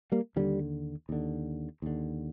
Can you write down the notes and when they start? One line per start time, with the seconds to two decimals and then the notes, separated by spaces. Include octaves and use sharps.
0.12 G3 A#3
0.36 D#2 D3 D#3 G3
1.09 D#2 D3
1.82 D#2 D3